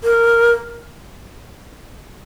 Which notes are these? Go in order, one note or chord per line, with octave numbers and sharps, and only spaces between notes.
A#4